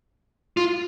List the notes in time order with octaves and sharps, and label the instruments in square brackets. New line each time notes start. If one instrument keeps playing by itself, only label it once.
[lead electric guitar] F4